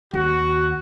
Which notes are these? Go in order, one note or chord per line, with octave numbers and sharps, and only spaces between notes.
D#2 F#4